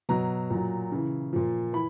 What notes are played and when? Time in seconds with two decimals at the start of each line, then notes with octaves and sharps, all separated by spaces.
0.09 B2 F#3 A#5
0.50 A#2 F#3
0.92 C#3 E3
1.33 A#2 F3
1.73 E3 B5